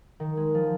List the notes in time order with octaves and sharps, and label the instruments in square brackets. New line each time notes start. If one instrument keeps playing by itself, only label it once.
[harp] D#3
G#3
F3